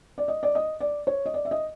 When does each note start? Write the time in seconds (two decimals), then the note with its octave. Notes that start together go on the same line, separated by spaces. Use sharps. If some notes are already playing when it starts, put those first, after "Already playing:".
0.18 D5
0.28 D#5
0.43 D5
0.55 D#5
0.80 D5
1.07 C#5
1.26 D#5
1.34 D5
1.45 E5
1.51 D#5